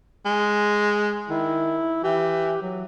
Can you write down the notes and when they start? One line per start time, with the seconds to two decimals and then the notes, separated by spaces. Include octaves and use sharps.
0.25 G#3
1.30 D#3 E4
2.04 E3 G4
2.62 F#3